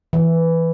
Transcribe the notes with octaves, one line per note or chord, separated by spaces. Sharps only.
E3